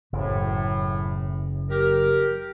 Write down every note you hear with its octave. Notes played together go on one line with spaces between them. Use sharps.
F#1 F#2 A2 E3
G4 A#4